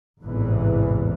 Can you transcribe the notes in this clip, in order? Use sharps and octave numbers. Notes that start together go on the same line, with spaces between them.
A1 E2 G#2 C3 E3